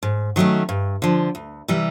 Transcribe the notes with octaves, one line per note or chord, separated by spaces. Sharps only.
G#2
D#3 F#3 A3 C#4
G2
D3 F3
D2
C3 E3 G3